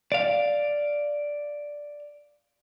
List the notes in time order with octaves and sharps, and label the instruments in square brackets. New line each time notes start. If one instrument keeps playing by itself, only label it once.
[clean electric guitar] D5 F5